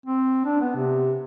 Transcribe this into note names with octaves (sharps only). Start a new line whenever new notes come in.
C4
D4
B3
C3